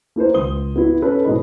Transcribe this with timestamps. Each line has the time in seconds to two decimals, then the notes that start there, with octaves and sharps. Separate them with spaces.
0.16 A#3 E4 B4 C5
0.34 C#2 C6 D#6 G7
0.76 B3 E4 F#4
1.02 C#4 A4 B4
1.24 G#2 B2 E3 G#4 D#5 B5